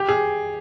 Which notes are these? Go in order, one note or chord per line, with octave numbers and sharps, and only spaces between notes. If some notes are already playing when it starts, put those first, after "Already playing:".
Already playing: G4
G#4